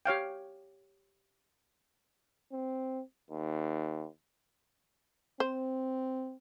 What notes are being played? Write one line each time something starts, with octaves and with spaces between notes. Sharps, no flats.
G4 C#5 F5 G5
C4
D#2
C4 C5